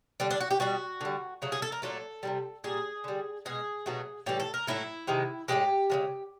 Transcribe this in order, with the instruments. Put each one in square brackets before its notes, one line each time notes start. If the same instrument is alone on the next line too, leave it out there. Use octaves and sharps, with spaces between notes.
[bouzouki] D3 G3 D4
D4
F#4
G4
B2 G3 F#4
D3 G3
C#3 F#3 A3
G#4
A4
A#4
A#2 F#3 A3 A4
C3 E3 G3
A#2 G3 G#4
D3 G3
B2 G#3 G#4
B2 F#3 A3
A2 E3 G3 G4
A4
A#4
A2 F#3 A3 E4
C3 D#3 G#3
A2 F3 G#3 G4
C#3 F3 G#3